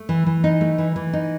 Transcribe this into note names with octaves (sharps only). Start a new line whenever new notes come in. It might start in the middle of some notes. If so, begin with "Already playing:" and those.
Already playing: A3
E3
E3
D#4
A3
E3
E3
D#4